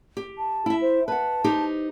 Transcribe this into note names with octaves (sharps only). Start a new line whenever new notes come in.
G4
A5
E4 E5
C5
B4 F#5 A5
D#4 G4 C5